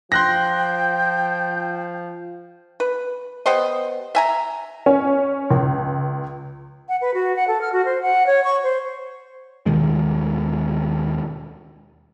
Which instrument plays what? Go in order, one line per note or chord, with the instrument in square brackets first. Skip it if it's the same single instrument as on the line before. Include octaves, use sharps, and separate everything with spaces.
[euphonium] F3 [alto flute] G5 [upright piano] C6 F#6 A#6 [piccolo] G6
[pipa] B4
B3 G4 C5 D#5
E5 G#5 A#5
[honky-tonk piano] C#4
C#2
[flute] F#5
B4
F#4
F#5
A4
F6
F#4
C5
F#5
C#5
C#6
C5
[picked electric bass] D#2 B2 D#3 G#3